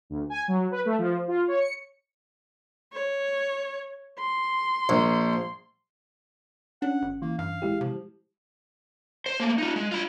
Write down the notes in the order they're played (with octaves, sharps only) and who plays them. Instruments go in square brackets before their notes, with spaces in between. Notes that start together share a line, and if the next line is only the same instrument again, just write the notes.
[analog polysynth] D2
G#5
F#3
B4
A3
F3
F4
C#5
C#7
[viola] C#5
C6
[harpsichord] A#1
[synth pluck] C#4 [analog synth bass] D4 [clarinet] F#5
[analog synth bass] G#1
[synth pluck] E3 [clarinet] A#3
[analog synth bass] G2 [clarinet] F5
[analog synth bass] D#1 [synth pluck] G#3 E4 G4
[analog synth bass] C3 [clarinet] F3
[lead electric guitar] C5
A3 A#3
D#4 F4
G#3
F4 B5